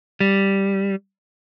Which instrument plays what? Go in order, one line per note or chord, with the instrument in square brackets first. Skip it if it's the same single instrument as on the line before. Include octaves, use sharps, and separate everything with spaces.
[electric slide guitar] G3